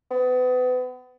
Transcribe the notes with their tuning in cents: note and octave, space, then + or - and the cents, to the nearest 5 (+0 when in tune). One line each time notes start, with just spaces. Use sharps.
B3 +35